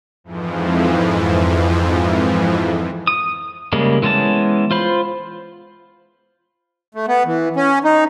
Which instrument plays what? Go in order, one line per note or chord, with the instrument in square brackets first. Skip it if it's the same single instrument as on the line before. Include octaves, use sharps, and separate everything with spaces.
[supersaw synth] F2 G#2 E3 F3
[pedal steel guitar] D#6
C#3 G3 G#3 A#3
E3 G#3 B3 C#4 A5
F4 C5 B5
[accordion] A3
B3
E3
C#4
D#4